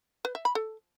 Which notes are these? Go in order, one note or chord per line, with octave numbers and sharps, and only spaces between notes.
B4
E5
B5
A4